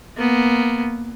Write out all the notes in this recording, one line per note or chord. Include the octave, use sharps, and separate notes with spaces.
A#3 B3